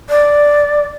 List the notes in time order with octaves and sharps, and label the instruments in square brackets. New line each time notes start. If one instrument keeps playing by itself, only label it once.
[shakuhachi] D5